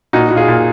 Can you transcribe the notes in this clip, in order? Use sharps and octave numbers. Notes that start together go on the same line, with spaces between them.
A#2 D#4 F#4
A#2 F#4
F4 G#4
A#2